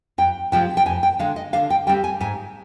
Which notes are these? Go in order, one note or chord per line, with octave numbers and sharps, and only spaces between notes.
F2 G5
C3 F3 G#3 C4 G5
G5
F2 G#5
G5
D3 G#3 F5
D#5
D3 F5
G5
G3 C4 G5
G#5
G#2 G#5